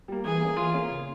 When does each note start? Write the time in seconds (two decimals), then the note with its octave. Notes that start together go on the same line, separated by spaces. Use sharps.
0.08 G3 A#3
0.25 E3 G#4
0.40 A#3 C#4
0.57 E3 F4
0.74 A#3 C#4
0.90 C#3